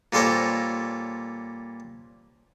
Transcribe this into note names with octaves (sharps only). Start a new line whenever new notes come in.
A#2 G3 A4 C5 C#5 A#5